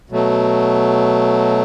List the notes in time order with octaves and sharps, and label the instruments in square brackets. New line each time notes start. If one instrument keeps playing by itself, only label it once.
[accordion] B2 F#3 A3